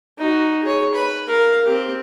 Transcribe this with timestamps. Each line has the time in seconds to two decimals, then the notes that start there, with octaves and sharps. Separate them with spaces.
0.18 D#4 F#4
0.63 G#4 C#5
0.95 B4 B5
1.28 A#4 F5
1.66 C4 G4